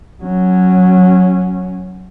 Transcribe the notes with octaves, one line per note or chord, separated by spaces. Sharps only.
F#3 C#4